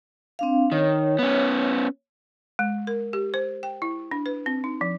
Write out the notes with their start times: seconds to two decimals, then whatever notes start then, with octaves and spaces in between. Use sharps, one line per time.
0.39 C4 D4 F5
0.72 D#3 C#5
1.19 B3 C#4
2.59 G#3
2.87 A#4
3.13 G4
3.34 C5
3.63 G5
3.82 E4
4.11 D4
4.26 B4
4.46 C4
4.64 D#4
4.81 F3